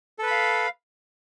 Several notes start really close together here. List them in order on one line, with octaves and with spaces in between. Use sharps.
A4 B4 B5 F5